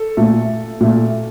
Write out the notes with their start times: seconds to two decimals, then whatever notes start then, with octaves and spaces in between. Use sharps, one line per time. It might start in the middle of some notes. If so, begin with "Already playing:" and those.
Already playing: A4
0.17 A#2 A3
0.81 A#2 A3